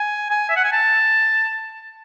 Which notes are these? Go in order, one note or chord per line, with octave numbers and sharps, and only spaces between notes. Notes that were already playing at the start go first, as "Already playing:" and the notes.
Already playing: G#5
G#5
E5
F#5
G#5
A5